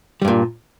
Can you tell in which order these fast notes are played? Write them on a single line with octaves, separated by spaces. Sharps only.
G3 G2 A#2